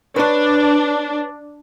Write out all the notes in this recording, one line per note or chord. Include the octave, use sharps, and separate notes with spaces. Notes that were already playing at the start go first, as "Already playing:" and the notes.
D4 B4 C#5